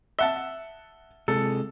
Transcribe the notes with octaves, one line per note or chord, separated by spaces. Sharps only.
E5 F#5 A5 G7
C3 G#3 A4